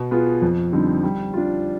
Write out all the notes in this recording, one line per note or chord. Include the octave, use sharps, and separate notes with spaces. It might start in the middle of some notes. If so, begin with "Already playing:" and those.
Already playing: B2
B3 F4 G#4
F2
D3 G3 C4 D#4
G3
D4 F4